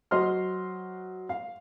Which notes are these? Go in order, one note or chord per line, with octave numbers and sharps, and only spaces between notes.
F#3 C5 D#5 C6 F6
F5